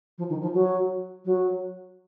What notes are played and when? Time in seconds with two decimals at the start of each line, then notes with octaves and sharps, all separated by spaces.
0.18 F3
0.30 D#3
0.42 F3
0.54 F#3
1.25 F#3